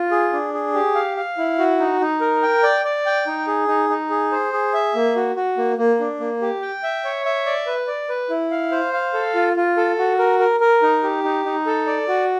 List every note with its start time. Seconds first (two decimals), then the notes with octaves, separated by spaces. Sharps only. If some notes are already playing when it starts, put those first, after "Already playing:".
Already playing: F4
0.11 G#4
0.33 D4
0.54 G#4
0.74 G4
0.95 F5
1.17 F5
1.38 E4
1.59 F#4
1.80 D#4
2.01 D#4
2.21 A#4
2.43 G5
2.63 D5
2.84 D5
3.06 G5
3.27 D#4
3.48 G#4
3.68 D#4
3.89 D#4
4.10 G#4
4.32 C5
4.53 G#4
4.74 E5
4.95 A#3
5.16 F#4
5.36 F#4
5.58 A#3
5.78 A#3
6.00 D4
6.20 A#3
6.42 G4
6.62 G5
6.83 E5
7.05 C#5
7.25 E5
7.46 D5
7.67 B4
7.88 D5
8.09 B4
8.30 E4
8.51 F5
8.72 C5
8.93 F5
9.14 A4
9.35 F4
9.57 F4
9.77 A4
9.98 F#4
10.19 A#4
10.39 A#4
10.60 A#4
10.82 D#4
11.03 G4
11.24 D#4
11.45 D#4
11.66 A4
11.87 D5
12.08 F#4